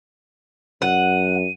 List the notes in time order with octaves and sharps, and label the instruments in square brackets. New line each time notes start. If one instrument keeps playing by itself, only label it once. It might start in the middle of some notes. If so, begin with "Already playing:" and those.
[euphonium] F#2 [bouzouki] F#5 [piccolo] D#7